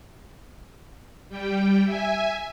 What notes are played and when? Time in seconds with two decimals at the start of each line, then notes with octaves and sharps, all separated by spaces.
1.29 G3 G5
1.84 E5 G#5